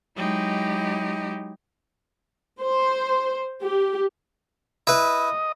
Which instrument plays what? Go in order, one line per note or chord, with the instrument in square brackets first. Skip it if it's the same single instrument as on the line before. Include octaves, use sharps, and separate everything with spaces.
[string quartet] F#3 G#3 D#4 E4 G4
[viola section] C5
G4
[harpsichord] E4 B4 [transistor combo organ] D#5